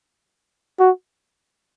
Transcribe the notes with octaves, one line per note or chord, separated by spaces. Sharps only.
F#4